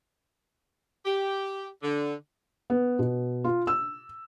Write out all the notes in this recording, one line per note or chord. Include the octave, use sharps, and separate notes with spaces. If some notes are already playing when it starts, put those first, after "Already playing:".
G4
D3
B3
B2
F4
E6